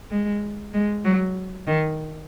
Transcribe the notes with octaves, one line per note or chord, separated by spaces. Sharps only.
G#3
G#3
F#3
D#3